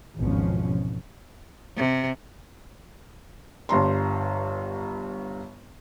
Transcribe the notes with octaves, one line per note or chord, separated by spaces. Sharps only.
G#1 E2 B2 F3 C#4
C3
G1 G2 A#5 C6